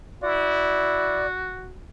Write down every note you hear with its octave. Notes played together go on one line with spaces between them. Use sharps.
E4 F#4 D5